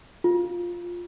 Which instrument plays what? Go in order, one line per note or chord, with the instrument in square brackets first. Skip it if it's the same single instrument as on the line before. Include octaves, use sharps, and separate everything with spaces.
[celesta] F4